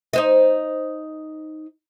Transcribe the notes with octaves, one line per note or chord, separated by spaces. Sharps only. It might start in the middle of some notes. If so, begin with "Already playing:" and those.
D#4 C5 D#5